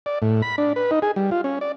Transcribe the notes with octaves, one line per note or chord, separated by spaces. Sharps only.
D5
A2
B5
D4
B4
D#4
G#4
G3
F4
C#4
D5